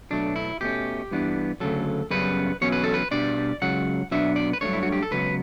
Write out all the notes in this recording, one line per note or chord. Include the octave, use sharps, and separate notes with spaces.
B1 B2 F#3 A3 D4
E4
B2 A3 C#4 G4
G2 E3 B3 D4
D2 C#3 F#3 A4
F#2 C#3 G3 B3 B4
E2 B2 F#3 C#4 C#5
B4
A4
B4
B2 G3 D4 D5
C#2 C#3 F#3 F#5
B2 F#3 B3 D4 E5
D5
B4
G2 F#3 A3 D4 C#5
E4
F#4
G4
A4
C#2 C#3 F#3 B3 B4